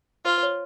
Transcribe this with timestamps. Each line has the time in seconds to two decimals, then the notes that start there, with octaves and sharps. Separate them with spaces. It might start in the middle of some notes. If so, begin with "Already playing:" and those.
0.25 F4 C5
0.38 C5
0.43 C#5